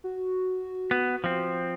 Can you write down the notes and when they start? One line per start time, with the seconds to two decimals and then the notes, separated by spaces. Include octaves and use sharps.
0.04 F#4
0.91 B3
1.24 F3 C4